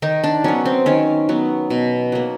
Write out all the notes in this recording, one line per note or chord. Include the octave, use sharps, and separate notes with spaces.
D#3 D#4
D4
F#3 B3 C#4
C4
D#3 C#4
F#3 B3
B2
F#3 A#3